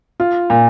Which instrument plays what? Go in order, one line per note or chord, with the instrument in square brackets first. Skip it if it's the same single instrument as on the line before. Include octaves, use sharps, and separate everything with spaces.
[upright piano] F4
A#2